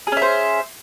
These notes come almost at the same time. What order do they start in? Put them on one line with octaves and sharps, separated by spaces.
G#4 C#4 E5 C5